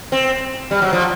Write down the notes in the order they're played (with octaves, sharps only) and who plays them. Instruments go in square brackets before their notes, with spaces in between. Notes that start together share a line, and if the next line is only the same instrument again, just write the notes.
[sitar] C4
G3
F#3
F3